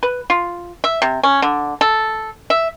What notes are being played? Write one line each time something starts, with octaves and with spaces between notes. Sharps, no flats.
B4
F4
E5
C3
C#4
D3
A4
E5